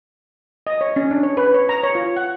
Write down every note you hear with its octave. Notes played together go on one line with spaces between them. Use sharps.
D#5
C#5
C#4
D4
C#5
B4
C#5
A#5
C#5
F4
F#5